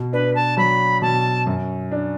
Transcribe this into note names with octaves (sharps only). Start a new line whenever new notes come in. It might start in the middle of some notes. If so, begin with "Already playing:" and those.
Already playing: B2
D4 B4
A5
F#3 B5
B2 A5
F#2
D4